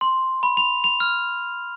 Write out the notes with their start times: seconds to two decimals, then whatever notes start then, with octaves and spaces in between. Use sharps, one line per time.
0.01 C6
0.43 B5
0.57 F7
0.84 F7
1.00 F6